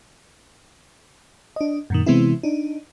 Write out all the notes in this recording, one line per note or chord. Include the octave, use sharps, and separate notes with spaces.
D4 D#5
F#2 A#2 D#3
C3 E3 G#3 B3 C4 E4
D4 D#4